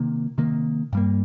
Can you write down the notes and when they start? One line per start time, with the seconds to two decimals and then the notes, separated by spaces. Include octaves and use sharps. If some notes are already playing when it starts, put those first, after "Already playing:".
Already playing: C3 D#3 A#3
0.38 C3 D#3 A#3
0.93 G2 G3 A#3